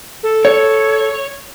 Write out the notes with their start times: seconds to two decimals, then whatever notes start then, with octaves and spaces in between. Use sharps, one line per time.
0.23 A4
0.45 C#5